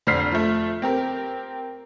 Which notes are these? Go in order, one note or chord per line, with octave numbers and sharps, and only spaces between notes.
F1 D3 C5 F6 B6 C7
F3 A3
C4 G4 A#4